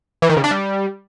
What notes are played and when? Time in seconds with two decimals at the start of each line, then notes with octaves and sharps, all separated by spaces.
0.22 E3
0.29 D#3
0.37 C#3
0.44 D4
0.51 G3